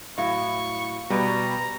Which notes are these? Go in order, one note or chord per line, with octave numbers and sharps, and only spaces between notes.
A2 F#3 E4 F5 C#6
B2 G3 B4 A#5